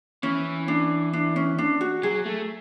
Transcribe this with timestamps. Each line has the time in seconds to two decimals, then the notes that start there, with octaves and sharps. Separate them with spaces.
0.23 E3 C#4
0.68 D4
1.13 D4
1.36 C#4
1.58 D4
1.81 F#4
2.03 F#3 G#4
2.26 A3